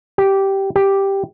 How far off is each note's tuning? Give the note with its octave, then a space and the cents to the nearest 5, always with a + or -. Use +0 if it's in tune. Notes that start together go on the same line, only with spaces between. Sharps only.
G4 -10
G4 +0